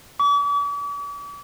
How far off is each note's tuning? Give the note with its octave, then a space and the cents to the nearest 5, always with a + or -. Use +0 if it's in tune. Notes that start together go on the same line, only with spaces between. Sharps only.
D6 -45